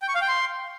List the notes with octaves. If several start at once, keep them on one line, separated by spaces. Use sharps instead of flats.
G5
C#6
F5
G5
C6